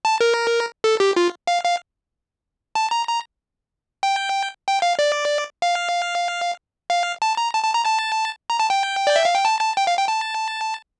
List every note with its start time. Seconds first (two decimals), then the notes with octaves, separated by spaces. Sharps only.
0.05 A5
0.21 A#4
0.84 A4
1.00 G4
1.16 F4
1.47 F5
1.64 F5
2.75 A5
2.91 A#5
3.07 A#5
4.03 G5
4.67 G5
4.82 F5
4.99 D5
5.62 F5
6.90 F5
7.22 A5
7.37 A#5
7.53 A5
7.64 A5
7.74 A#5
7.85 A5
8.50 A#5
8.59 A5
8.70 G5
9.07 D5
9.16 E5
9.25 F5
9.35 G5
9.45 A5
9.60 A5
9.77 G5
9.87 F5
9.98 G5
10.08 A5